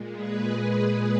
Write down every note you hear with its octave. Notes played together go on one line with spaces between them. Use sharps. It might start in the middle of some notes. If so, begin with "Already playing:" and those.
Already playing: A#2 G#3
G#4 B4